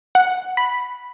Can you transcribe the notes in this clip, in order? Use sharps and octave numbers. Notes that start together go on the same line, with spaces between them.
F#5
B5